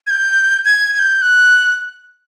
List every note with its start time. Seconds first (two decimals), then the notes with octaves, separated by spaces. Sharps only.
0.07 G#6
0.10 G6
0.65 G#6
0.94 G#6
0.99 G6
1.22 F#6